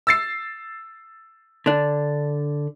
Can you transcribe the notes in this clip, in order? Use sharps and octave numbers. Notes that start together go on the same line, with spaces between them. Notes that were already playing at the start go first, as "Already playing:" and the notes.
E6 A6 C7
D3 D4